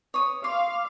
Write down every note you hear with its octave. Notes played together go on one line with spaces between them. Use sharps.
C#5 D#6
F5 C6 D6